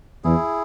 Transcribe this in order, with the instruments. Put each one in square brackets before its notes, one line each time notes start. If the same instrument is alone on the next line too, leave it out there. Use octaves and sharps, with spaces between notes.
[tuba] E2 [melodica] E4 G#4